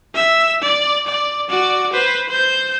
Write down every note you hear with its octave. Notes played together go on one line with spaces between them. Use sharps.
E5
D5
D5
F#4 D5
B4 C5
C5 G6